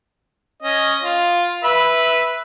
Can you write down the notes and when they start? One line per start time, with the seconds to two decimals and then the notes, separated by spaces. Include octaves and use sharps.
0.63 C#4 D#5
1.03 F4
1.64 B4 E5 B5